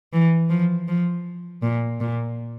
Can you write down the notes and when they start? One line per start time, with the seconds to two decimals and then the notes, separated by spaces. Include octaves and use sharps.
0.13 E3
0.50 F3
0.88 F3
1.63 A#2
2.00 A#2